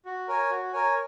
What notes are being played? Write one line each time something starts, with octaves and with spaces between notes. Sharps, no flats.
F#4
A#4 C#5 G#5
F#4
A#4 C#5 G#5